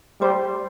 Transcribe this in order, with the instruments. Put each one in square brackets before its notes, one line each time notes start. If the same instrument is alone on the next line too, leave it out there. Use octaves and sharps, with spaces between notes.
[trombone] G3 [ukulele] C5